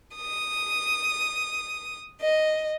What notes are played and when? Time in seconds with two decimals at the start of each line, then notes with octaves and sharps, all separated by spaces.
0.15 D#6
2.20 D#5